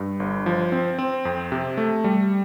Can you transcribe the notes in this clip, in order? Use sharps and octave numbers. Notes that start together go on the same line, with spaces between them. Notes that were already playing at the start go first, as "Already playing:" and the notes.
Already playing: G2
G1
F3
C4
C4
F2
C3
A3
G3